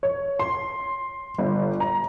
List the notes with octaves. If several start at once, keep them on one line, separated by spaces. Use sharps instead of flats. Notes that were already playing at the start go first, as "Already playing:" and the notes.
C#5
C6
G1
A#5